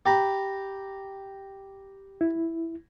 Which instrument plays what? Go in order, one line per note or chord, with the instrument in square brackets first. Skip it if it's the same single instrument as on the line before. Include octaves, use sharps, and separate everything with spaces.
[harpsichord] G4 A#5 B5
[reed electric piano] E4